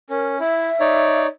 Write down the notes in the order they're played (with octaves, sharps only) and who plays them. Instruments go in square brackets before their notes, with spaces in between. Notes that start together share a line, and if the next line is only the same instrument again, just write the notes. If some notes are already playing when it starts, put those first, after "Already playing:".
[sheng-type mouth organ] C#4 [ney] A#4
[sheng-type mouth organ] E4 [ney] E5
[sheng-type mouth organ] D#4 C#5 D5